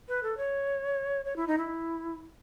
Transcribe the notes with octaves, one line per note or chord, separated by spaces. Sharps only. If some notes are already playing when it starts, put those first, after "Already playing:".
B4
A4
C#5
C#5
E4
D#4
E4